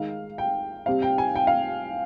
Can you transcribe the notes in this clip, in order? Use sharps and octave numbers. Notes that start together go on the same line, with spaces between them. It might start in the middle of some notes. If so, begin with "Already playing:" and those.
Already playing: D#3 G#3 D#4 F5
G5
C3 G3 C4 F5
G5
G#5
G5
F5